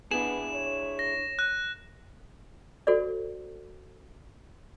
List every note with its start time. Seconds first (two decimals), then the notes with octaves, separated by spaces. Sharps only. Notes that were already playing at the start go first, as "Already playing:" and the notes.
0.11 B3 D4 E4 G#4 E7
0.53 C#5
0.99 A#6
1.39 F#6
2.87 F#4 A4 C5 D5